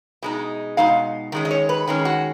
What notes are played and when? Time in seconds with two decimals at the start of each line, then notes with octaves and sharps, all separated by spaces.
0.23 B2 G#3 D#4
0.77 B2 G#3 D#4 F5
1.32 D#3 G#3 C#4
1.45 D#5
1.51 C#5
1.69 B4
1.88 D#3 G#3 C#4
2.05 F#4